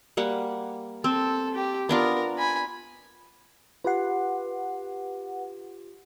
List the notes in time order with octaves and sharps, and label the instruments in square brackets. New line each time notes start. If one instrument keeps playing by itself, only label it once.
[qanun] G3 A#3 F#5
[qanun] C4 [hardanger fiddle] A4
[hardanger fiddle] G4
[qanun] B3 D4 F4 [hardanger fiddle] A#4
[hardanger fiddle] G#5 B5
[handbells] F4 G4 C7 [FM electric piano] B4 F#5